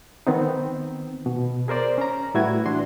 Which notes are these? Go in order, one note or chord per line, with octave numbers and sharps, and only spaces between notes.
D#3 B3 C4 D#4
B2
G#4 A#4 C5 D5
C#4 A#5
A2 G3 E4 F#4 B4 G#6
E3 D4 F#4 C6